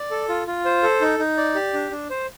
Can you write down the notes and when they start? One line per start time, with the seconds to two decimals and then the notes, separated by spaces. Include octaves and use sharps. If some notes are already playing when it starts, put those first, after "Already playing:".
Already playing: D5
0.11 A4
0.29 F4
0.47 F4
0.65 C5
0.83 A4
1.01 D#4
1.19 D#4
1.37 D5
1.55 G4
1.74 D4
1.91 D4
2.10 C5